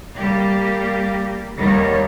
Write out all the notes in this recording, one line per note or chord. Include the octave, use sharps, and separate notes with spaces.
G3 A#3 G4
D#2 D#3 G3 A#3 B3 C#5